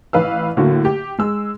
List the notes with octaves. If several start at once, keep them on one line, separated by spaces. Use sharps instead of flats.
A1 B4 F5 E6
A2 D3 F#3 A#3 F#4
G4
G#3 E6